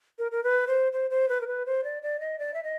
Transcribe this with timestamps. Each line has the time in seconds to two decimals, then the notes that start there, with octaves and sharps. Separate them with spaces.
0.19 A#4
0.32 A#4
0.44 B4
0.67 C5
0.93 C5
1.11 C5
1.29 B4
1.41 A#4
1.47 B4
1.66 C5
1.84 D5
2.03 D5
2.20 D#5
2.39 D5
2.54 E5
2.63 D#5